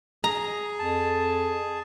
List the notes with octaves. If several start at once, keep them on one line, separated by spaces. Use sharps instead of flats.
G#4 A#5
F2 A5